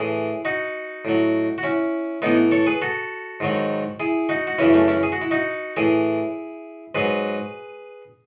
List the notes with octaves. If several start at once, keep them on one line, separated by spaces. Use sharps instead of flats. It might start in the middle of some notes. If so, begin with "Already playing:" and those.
Already playing: A2 E3 E4 G#4
D#4 F#4
A2 F#3
F#4
C#4 E4
A2 E3 B3 D#4
A4 C#5
G#4 B4
F#4 A4
G#2 D#3 F#3
E4 G#4
D#4 F#4
F#4
F#2 C#3 E3 C#4 E4
A3 C#4
C#4 E4
G#4
F#4
E4
D#4 F#4
A2 E3 E4 G#4
G#2 F#3 G#4 B4